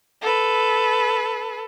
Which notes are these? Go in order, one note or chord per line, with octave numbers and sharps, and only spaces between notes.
A4 B4